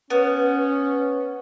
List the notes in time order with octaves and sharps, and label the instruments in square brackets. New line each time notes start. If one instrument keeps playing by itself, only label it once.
[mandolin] B3 [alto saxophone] C#4